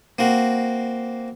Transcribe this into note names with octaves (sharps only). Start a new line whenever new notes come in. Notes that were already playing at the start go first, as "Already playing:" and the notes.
A#3 C4 F#4